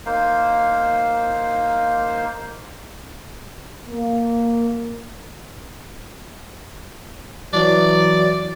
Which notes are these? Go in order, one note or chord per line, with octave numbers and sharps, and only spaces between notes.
A#3 D#4 C5 F5
A#3
E3 F#3 D5